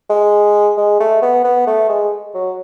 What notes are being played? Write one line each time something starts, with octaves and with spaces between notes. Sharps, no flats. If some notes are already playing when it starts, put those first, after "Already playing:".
G#3
G#3
A3
B3
B3
A3
G#3
F#3